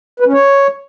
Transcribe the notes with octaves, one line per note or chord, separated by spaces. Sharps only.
B4
C#4
C#5